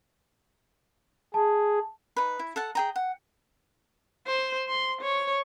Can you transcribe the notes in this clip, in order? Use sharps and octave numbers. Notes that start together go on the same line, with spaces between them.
G#4 A5
D#4 B4
E4
A4 F#5 A5
G#4 G5 A#5
F#5
C5
C6
C#5